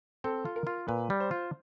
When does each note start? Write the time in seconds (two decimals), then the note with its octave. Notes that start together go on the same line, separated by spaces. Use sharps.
0.24 C4 A4
0.45 F4
0.56 A#4
0.67 F4
0.88 A#2 B4
1.10 G3
1.20 C5
1.31 F4